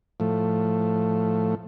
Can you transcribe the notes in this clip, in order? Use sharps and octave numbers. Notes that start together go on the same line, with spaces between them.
A2 F3 A3